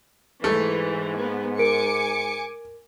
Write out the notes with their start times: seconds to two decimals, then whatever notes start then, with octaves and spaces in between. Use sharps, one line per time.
0.44 G#2 E3 A3
1.20 B3
1.59 A#4 G#5 D6 C#7 D7